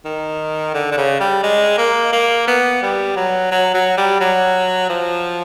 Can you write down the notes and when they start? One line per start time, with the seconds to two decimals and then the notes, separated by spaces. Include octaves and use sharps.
0.05 D#3
0.74 D3
0.91 D3
0.97 C#3
1.20 G3
1.43 G#3
1.78 A#3
2.13 A#3
2.48 B3
2.82 G3
3.16 F#3
3.51 F#3
3.74 F#3
3.97 G3
4.20 F#3
4.89 F3